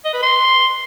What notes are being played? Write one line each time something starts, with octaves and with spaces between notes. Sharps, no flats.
D#5
B4
C6